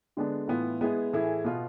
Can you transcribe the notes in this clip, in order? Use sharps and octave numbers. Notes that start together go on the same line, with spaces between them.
D3 G#3 B3 D4
A2 E3 B3 F4
G#3 B3 E4 G#4 B4
A2 E3 A3 E4 G#4
B2 B3 F4